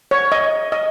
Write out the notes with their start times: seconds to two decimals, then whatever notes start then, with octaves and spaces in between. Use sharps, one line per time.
0.11 C#5
0.32 D#5
0.72 D#5